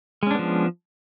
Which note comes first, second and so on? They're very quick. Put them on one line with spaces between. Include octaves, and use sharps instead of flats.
G#3 C#4 D4 B3 F3